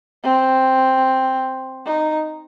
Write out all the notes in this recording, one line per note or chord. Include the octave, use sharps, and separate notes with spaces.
C4
D#4